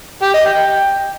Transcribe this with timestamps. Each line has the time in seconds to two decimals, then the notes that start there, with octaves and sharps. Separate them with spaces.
0.22 G4
0.34 D#5
0.46 G5